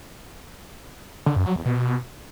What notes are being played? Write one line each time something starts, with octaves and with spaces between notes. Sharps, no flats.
D3
F#2
F#3
E2
B2